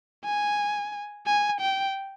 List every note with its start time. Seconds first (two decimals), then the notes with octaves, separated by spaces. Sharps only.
0.25 G#5
1.27 G#5
1.61 G5